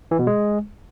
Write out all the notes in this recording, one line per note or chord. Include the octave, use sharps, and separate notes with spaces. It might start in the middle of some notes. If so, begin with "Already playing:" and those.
E3
B2
G#3